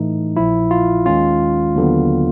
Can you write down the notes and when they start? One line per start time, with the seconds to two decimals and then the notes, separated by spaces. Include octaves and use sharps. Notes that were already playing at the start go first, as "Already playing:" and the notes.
Already playing: A2 E3 A3 D#4
0.36 A#1 A#2 F3 E4
0.71 F4
1.06 D#2 D#3 G#3 C#4 F4
1.76 D#2 D3 F#3 B3